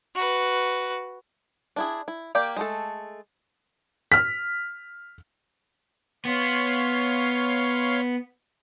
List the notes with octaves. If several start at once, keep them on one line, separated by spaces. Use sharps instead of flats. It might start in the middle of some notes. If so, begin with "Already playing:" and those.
F#4 B4
D4 E4 G#4
E4
A#3 G4 D5 F5 G5
G#3 A3 A4
F6 B6
B3 C#5 F5 C6